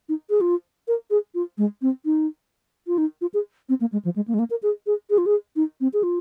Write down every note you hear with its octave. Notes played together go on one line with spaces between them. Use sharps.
D#4
G#4
F4
A#4
G#4
F4
G#3
C4
D#4
F4
D#4
F4
G#4
C4
A#3
G#3
F3
G#3
A#3
G#3
A#3
A#4
G#4
G#4
G#4
F4
G#4
D#4
C4
G#4
F4